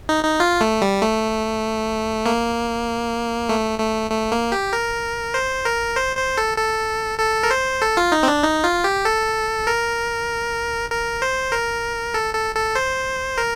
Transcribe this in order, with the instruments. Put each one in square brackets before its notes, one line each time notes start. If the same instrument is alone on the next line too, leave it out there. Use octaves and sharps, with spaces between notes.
[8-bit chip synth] D#4
D#4
F4
A3
G3
A3
A#3
A3
A3
A3
A#3
G4
A#4
C5
A#4
C5
C5
A4
A4
A4
A#4
C5
A4
F4
D#4
C4
D4
D#4
F4
G4
A4
A#4
A#4
C5
A#4
A4
A4
A4
C5
A#4